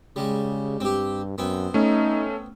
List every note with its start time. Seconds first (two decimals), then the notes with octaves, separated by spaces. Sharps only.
0.16 C#3 G3 G#3
0.80 G2 C4 G4
1.38 F#2 B3 C4
1.74 A3 C#4 D#4